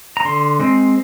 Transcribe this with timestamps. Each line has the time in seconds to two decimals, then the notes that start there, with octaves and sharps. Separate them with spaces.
0.17 A#5
0.25 D3 C6
0.60 G#3 C4